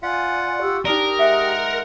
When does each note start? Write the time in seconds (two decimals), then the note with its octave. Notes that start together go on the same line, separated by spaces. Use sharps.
0.03 F4 D5 F5 F#5 G#5
0.60 G4 C#6 E6
0.85 D4 D#4 G4 A#4 D5 G5 D#6
1.19 G#3 E5 F#5